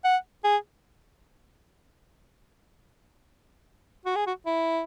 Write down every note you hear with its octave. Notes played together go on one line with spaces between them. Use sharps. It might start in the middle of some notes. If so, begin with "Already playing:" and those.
F#5
G#4
F#4
G#4
F#4
E4